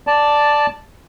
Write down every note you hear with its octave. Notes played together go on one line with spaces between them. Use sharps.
D5 A5